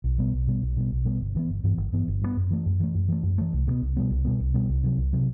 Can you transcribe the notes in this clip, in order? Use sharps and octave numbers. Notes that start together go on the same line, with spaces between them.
B1
B2 G3 B3
B1
B2 G3 B3
B1
B2 G3 B3
B1
B2 G3 B3
G1
G2 E3 B3
G1
G2 E3 B3
G1
G2 E3 B3
G1
G2 E3 B3
F#2
E3 A3
F#2
E3 A3
F#2
E3 A3
F#2
E3 A3
C2
B2 G3 B3
C2
B2 G3 B3
C2
B2 G3 B3
C2
B2 G3 B3
C2
C3 F#3
C2
C3 F#3